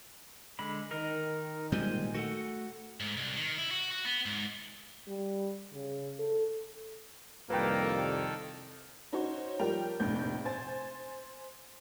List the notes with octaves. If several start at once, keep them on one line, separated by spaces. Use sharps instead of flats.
D3 G#3 B5
D#3 D#4 A#4 D#5
A#2 G3 G#3 C5 G#5
A3 F#4 A4 F#5
G#2
C2
D#3
E4
F#4
F#4
B3
G#2
G3
C#3
A4
C2 F2 D#3 G3 A#3 A4 B4 G5
C#4 D#4 F#4 C5 C#5
F3 G3 A#4 G5 F7
F1 A#1 A2 G6
C5 G#5 A6